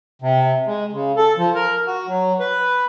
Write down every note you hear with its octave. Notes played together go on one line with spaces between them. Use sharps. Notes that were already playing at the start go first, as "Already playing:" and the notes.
C3
G#3
C#3
A4
F3
A#4
F#4
F#3
B4